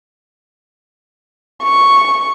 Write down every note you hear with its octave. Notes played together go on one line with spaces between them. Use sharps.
C#6